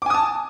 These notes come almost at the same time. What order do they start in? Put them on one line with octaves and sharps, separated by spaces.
D6 G#5 D#6 A5